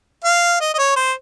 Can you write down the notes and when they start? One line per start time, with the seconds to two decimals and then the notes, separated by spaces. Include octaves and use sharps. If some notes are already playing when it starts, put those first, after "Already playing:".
0.24 F5
0.61 D#5
0.74 D#5
0.78 C#5
0.96 C5